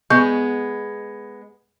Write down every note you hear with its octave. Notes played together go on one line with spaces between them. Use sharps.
G#3 B3 C#6 G6